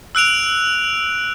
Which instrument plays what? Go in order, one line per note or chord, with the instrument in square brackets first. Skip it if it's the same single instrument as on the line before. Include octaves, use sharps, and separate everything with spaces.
[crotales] E6 F#6 D7 F7